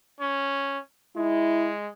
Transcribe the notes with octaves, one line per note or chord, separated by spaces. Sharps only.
C#4
G#3 E4